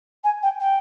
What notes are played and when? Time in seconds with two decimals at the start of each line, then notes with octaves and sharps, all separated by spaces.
0.23 G#5
0.42 G5
0.59 G5